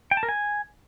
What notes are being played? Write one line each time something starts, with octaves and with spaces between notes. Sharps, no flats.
G5
A5
A#4
G#5